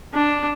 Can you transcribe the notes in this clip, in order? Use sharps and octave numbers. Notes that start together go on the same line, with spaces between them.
D4